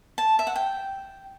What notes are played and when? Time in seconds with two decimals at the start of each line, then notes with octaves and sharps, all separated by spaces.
0.18 A5
0.39 E5
0.47 F#5
0.56 G5